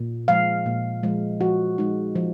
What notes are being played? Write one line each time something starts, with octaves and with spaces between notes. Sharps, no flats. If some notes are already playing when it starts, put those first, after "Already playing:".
Already playing: A#2
F3 G#3 F5
A#2
F3 G#3
F3 F#4
G#3 D#4
F3